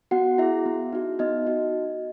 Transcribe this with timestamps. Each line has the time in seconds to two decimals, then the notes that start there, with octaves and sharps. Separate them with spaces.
0.11 B3 F#4 F#5
0.38 E4 G#4 E5
0.66 B3
0.93 D#4 F#4
1.19 B3 D#4 D#5
1.46 D#4 F#4